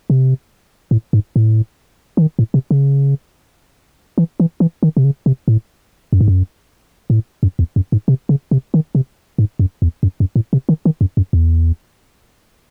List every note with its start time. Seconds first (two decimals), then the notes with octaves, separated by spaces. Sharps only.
0.10 C3
0.91 A2
1.13 G#2
1.36 A2
2.17 E3
2.22 D#3
2.39 A2
2.54 C3
2.71 C#3
4.18 E3
4.40 E3
4.60 E3
4.83 D#3
4.97 C3
5.04 C#3
5.26 C3
5.48 A2
6.13 F#2
6.21 G#2
6.28 F#2
7.10 A2
7.43 F#2
7.59 E2
7.76 F#2
7.92 G#2
8.08 C3
8.29 C#3
8.51 C3
8.74 D#3
8.95 C3
9.38 G#2
9.59 F#2
9.82 E2
10.03 F#2
10.20 F#2
10.36 A2
10.53 C3
10.69 D#3
10.85 D#3
11.01 F#2
11.17 F#2
11.33 E2